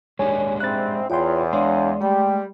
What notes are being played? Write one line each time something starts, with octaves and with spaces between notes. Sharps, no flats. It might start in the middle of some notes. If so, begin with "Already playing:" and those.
D#2 G#3 D4 G4 C#5 G#5
G#2 C4 E5 B5 F#6 A6
E2 F4 C#5 G5 B5 C6
G#3 D4 C#5 D5 F5 C6
G3 A3 G5